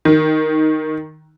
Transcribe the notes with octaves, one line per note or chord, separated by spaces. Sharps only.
D#3